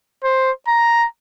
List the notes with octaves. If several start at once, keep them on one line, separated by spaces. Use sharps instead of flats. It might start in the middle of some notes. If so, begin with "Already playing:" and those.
C5
A#5